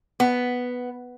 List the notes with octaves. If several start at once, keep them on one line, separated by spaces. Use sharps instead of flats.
B3